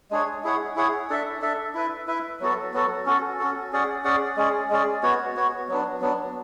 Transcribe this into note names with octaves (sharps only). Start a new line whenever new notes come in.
G#3 D4 G#4 C#5
E4 G#4 C#5 F#5
E4 G#4 C#5 F#5
D4 A4 E5
D4 A4 E5
E4 B4 E5
E4 B4 E5
F#3 B3 F#4 A4
F#3 B3 F#4 A4
C#4 F#4 A4
C#4 F#4 A4
C#4 G#4 D5 F#5
C#4 G#4 D5 F#5
G#3 C#4 G#4 D5
G#3 C#4 G#4 D5
B3 F#4 C#5
B3 F#4 C#5
F#3 B3 D4
F#3 B3 D4